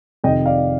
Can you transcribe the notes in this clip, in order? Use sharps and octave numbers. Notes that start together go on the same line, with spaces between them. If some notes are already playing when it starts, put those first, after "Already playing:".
F1 F2 C3 D#3 D#5 G5
D5 F5